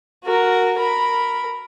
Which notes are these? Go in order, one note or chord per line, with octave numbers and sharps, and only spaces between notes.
F#4 A#4
A#4 B5